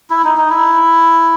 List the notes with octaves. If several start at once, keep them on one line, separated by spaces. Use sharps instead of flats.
E4
D#4
D#4
E4